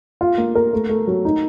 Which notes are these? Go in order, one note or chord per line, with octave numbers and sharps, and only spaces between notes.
F4
A#3
A#4
A3
A3
F#3
D#4